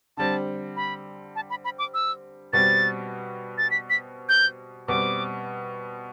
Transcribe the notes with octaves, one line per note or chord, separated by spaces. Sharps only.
D3 G3 C4 A5
B5
A5
B5
B5
D6
E6
B2 G3 C4 F#4 A6
A6
B6
B6
G6
B2 G3 C4 D6